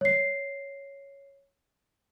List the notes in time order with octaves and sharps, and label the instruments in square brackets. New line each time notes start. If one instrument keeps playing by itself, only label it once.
[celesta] C#5 C7